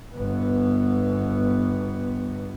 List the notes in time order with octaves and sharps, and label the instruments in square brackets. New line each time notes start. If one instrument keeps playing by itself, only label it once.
[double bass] G1 B3